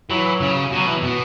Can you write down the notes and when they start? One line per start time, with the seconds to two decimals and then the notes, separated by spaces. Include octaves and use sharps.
0.10 E3 F#3
0.41 C#3
0.71 B2
0.76 F#3
0.87 E3
1.03 B2